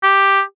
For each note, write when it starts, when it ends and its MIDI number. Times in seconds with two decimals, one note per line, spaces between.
0.03 0.42 67